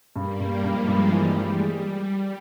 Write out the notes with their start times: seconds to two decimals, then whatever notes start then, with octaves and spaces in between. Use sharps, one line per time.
0.16 G2 G3 A#3
0.40 G2
0.63 G2 F3 G#3
0.88 G2
1.12 E3 G3
1.36 E3
1.60 G#3